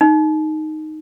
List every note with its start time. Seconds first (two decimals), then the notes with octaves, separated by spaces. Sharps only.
0.01 D#4